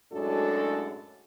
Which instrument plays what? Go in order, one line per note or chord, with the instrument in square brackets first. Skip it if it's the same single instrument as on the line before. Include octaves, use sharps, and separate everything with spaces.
[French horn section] F#2 A2 G#3 D4 F#4 A4